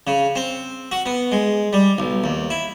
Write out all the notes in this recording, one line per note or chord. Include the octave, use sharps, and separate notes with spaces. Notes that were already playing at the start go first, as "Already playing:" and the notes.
C#3
C4
F#4
B3
G#3
G3
B1
D#2
E4